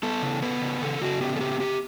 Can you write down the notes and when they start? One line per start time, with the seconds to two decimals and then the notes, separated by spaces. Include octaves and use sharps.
0.03 B3 A4
0.22 C#3
0.42 B3 B4
0.62 C#3
0.81 C#3 A4
1.02 C#3 F#4
1.21 B3 G4
1.36 A4
1.41 C#3 G4
1.60 C#3 G4